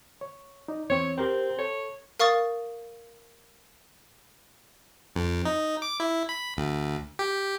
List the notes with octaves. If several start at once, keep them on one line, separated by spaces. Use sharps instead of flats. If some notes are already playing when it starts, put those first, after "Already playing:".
C#5
D#4 D5
E2 C4 C#5
C4 G4 A#4 C5
A4 C#5
A#4 F5 C#6 D#6 A6
F2
D#4
D6
E4
B5
D2
G4